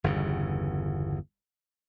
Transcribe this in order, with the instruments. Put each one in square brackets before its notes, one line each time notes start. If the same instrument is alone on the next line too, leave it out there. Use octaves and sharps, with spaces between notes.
[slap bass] G1 E2 C#3